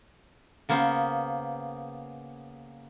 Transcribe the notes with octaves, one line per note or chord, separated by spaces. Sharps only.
C#3 A#3 B3 C5